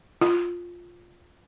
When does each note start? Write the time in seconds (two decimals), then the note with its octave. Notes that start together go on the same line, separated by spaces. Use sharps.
0.21 F4